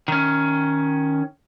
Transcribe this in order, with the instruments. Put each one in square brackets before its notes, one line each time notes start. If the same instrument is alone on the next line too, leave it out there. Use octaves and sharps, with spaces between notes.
[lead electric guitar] D#3 C#4